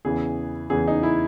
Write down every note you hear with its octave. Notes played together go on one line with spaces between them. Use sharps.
E2 C#3 E3 G#4
E2 C#3 E3 G#4
D#4
E4